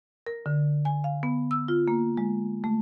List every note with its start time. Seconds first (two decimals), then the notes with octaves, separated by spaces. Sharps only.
0.27 A#4
0.46 D3
0.85 G#5
1.04 F5
1.23 B3
1.51 E6
1.68 F4
1.88 A#3
2.17 G#3
2.64 A3